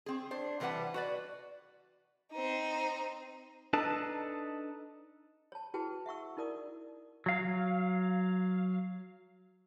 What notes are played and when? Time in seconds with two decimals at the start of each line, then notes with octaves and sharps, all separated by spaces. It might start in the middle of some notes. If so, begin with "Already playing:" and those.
0.06 C4 G#4
0.31 D4 C5
0.60 C3 E3 G3 B4 F#5 A5
0.94 F#4 B4 D5
2.31 C4 D#4
3.73 D4 D#4 A4 B4 A5
5.52 C#5 A5
5.74 E4 F#4 G#4 B4 G5 A5
6.06 E5 F#5 C#6 E6
6.37 D#4 E4 A#4 D5 D#6
7.26 F#3 F5